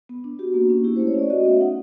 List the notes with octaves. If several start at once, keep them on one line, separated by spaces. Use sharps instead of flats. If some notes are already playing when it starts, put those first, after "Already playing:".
B3
D4
F#4 G4
A#3
C#4
E4 G4
C5
A3
C#5
C#4 D5
F#4 D#5
B3 E5
D#4 F#5